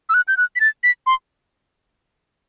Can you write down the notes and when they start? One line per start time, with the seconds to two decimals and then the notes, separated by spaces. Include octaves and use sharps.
0.09 E6
0.14 F#6
0.28 G6
0.37 F#6
0.56 B6
0.61 A6
0.84 B6
1.07 C6